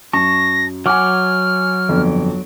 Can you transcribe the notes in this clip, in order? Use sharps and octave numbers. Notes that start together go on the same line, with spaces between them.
F#2 A5 C#6 A#6
F#3 F#5 G#5 D6 F6
G1 F2